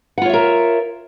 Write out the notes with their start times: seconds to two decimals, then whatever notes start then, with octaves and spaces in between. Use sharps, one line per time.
0.18 F#5
0.22 F4
0.26 C#5
0.29 E5
0.33 A#4